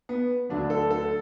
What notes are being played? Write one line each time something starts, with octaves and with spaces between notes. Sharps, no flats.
B3
D2 D3 F#3 D4
A4
A4